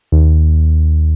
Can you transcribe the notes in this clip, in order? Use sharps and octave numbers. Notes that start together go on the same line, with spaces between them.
D#2